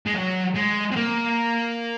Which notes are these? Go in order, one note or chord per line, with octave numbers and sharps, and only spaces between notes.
G#3
F#3
G#3
C4
A#3